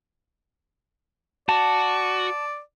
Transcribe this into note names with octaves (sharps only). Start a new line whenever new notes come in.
F#4 D5 A5